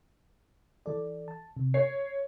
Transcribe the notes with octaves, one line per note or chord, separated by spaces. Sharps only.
E3 A4 D5
A5
C3
C#5 C7